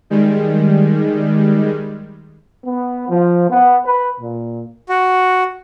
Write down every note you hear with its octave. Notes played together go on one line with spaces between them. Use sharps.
D#3 G3 G#3
B3
F3
B3
B4
A#2
F#4